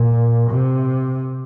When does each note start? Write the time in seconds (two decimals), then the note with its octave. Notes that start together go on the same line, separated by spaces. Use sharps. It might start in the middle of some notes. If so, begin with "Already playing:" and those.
Already playing: A#2
0.50 C3